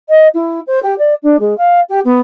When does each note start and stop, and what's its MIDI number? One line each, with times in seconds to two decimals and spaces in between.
0.09 0.27 75
0.34 0.59 64
0.67 0.79 72
0.83 0.94 67
0.98 1.14 74
1.22 1.36 62
1.39 1.56 56
1.57 1.80 77
1.89 2.00 67
2.04 2.20 59